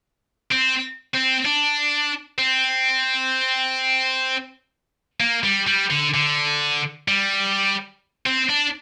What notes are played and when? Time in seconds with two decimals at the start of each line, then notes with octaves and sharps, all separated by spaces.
0.52 C4
1.15 C4
1.45 D4
2.39 C4
5.20 A#3
5.44 G3
5.67 G3
5.90 D3
6.14 D3
7.08 G3
8.26 C4
8.50 D4